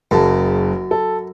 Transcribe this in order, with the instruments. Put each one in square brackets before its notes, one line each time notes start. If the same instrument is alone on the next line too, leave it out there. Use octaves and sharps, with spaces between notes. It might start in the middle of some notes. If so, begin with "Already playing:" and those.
[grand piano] F#1 C#3 A5 [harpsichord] F#2
[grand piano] A4